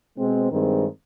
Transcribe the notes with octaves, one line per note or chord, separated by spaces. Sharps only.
B2 G#3 C4
G2 D#3 G#3 C4